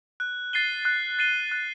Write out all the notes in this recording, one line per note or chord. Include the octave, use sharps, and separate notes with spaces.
F#6
A6 C7 D#7 G7
F#6
A6 C7 D#7 G7
F#6